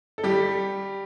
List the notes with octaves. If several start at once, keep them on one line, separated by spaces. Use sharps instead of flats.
A4
G3 G4